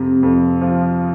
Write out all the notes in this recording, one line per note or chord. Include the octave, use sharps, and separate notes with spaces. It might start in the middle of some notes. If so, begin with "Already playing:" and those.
Already playing: F2 C3
F2
F3